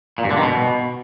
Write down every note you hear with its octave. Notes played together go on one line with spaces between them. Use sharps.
A#2
G2
D3
D#3
B2